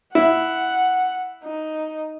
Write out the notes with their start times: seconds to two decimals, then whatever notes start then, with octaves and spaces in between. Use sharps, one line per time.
0.15 E4 F#5
1.44 D#4